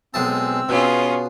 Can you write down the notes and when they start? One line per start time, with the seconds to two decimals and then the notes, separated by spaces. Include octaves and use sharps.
0.14 B1 G#3 C4 A5 E6
0.69 B2 B3 C#4 F4 G#4